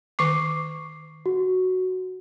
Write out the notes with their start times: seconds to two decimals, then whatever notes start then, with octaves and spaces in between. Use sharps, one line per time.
0.19 D#3 C#6 D6 C7
1.26 F#4